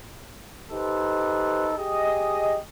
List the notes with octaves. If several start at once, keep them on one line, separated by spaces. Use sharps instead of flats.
D#4 G4 A4 B4 C5
G4 G#4 D#5